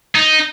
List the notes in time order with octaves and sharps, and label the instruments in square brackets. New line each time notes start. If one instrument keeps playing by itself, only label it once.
[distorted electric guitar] D#4